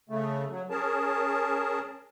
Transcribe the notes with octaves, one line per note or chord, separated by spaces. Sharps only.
C#3 A3
F#3
C#4 G#4 A#4 A5